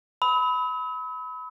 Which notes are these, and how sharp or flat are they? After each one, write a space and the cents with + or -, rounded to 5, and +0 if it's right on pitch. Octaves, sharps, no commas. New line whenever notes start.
B5 +15 E6 -45